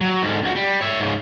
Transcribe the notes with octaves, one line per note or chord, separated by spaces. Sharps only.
F#3
G#2 D3
C#2 F#4
G3
C#5 E5
G#2 C#3